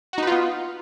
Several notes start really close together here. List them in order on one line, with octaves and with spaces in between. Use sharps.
F#4 D#4 B4 F4 B3